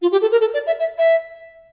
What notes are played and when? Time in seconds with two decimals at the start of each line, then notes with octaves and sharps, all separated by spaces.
0.02 F4
0.12 G4
0.21 A4
0.31 A#4
0.40 A4
0.53 D5
0.66 E5
0.79 E5
0.98 E5